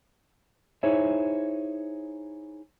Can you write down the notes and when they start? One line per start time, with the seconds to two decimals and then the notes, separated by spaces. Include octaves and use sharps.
0.83 D#4 E4 G#4 C5 C#5 E5